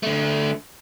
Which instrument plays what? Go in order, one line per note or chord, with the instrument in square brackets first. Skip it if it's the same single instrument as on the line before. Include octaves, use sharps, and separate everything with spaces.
[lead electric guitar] D3 A3